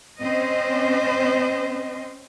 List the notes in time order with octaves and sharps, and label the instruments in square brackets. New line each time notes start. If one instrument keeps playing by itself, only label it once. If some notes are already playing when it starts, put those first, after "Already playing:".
[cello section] C4 C#4 C5 D#5